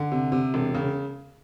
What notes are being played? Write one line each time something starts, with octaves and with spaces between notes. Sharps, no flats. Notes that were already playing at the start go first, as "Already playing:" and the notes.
Already playing: D3
C3
C3
E1
C#3